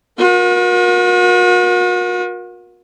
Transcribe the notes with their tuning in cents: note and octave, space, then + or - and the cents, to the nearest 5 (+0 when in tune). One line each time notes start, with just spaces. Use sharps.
F#4 -45 A#4 +30